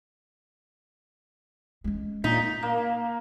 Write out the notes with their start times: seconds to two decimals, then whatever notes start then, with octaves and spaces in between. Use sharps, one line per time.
1.84 G#3 C#4
2.24 A#2 D#4 B6
2.63 A#3